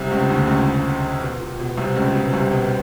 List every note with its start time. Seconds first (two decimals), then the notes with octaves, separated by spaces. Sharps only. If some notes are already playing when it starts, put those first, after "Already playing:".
Already playing: C2 C3
0.11 C#2 C#3
0.30 D2 D3
0.48 C#2 C#3
1.22 B2
1.40 A#2
1.59 B2
1.77 C2 C3
1.96 C#2 C#3
2.14 B2
2.33 C2 C3
2.51 B2